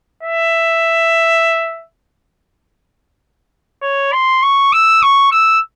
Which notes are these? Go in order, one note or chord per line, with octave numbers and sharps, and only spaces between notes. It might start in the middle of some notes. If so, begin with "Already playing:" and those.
E5
C#5
C6
C#6
E6
C#6
E6